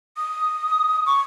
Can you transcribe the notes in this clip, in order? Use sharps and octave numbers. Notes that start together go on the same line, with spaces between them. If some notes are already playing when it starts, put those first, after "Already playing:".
D#6
C#6